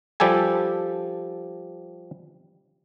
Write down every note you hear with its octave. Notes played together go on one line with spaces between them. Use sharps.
F3 G3 G4 A4 G#5